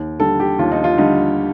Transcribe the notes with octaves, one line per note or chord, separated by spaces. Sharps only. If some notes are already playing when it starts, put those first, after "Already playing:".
Already playing: D#2
D3 G3 A4
G4
D#2 F4
D#4
F4
D3 G3 D#4